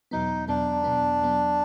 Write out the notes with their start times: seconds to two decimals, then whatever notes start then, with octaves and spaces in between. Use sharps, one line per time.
0.11 E2 B2 F#3 B3 D#4
0.48 E2 B2 F#3 B3 D4
0.84 E2 B2 F#3 B3
1.21 E2 B2 F#3 B3